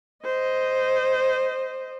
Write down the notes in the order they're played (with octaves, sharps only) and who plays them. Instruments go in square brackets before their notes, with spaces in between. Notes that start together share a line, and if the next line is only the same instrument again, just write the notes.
[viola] C5 D#5